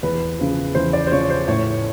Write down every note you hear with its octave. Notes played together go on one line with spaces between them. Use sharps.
E2 B4
C#3 F3
E2 C5
D5
C5
C#3 F3 C#5
C5
A2 C#5